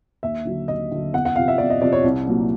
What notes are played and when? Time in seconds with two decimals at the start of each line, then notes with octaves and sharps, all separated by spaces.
0.23 D#2 E5
0.45 D3 F#3
0.68 D#2 D#5
0.91 D3 F#3
1.13 E2 F#5
1.25 F#5
1.36 C3 F3 F5
1.48 E5
1.58 E2 D5
1.70 D#5
1.81 C3 F3 D5
1.93 C#5
2.04 C2
2.27 A#2 F#3 A#3